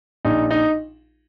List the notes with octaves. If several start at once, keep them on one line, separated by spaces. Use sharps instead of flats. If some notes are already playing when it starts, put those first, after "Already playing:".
A#1 D#4
D#4